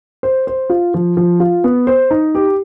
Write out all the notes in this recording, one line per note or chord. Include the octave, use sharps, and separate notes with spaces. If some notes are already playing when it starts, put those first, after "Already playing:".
C5
C5
F4
F3
F3
F4
B3
C5
D#4
G4